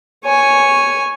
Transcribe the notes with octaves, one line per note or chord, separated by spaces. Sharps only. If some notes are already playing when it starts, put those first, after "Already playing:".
C#5 G#5